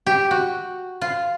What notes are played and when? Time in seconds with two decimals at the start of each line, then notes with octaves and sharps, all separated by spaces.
0.07 G4
0.31 F#4
1.01 F4